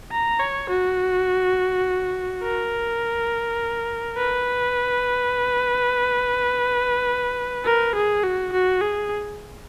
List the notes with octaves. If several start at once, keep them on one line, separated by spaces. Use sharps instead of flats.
A#5
C#5
F#4
A#4
B4
A#4
G#4
F#4
F#4
G#4